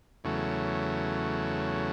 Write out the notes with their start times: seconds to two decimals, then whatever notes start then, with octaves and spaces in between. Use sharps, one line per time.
0.24 E2 C#3 F#3 A3